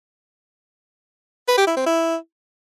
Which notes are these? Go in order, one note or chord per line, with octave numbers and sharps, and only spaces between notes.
B4
G4
E4
C4
E4